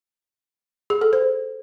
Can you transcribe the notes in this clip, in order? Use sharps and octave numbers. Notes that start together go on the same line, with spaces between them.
G#4
A4
C5